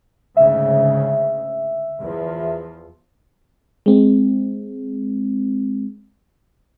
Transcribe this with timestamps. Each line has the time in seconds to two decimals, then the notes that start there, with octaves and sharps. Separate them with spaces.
0.37 D2 G#2 C#3 E5
2.00 E2 F3
3.86 G#3 C4